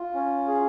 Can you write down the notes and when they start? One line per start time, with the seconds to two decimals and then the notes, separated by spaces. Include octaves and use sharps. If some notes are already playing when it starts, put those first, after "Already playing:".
Already playing: F4
0.15 C#4
0.47 G#4